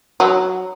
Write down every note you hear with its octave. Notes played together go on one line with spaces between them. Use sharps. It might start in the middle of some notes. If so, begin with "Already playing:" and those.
F#3